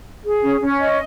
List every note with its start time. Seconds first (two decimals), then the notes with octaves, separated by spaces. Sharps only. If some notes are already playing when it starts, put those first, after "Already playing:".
0.24 G#4
0.42 C#4
0.60 C#4
0.78 D#5